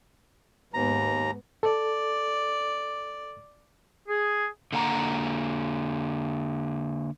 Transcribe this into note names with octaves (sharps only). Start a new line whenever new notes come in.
D#2 G#2 B3 A#5
A4 D5
G#4
D3 A#3 F#5 A#5